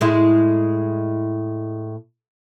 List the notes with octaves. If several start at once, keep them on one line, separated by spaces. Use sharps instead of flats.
A2 G#3 E4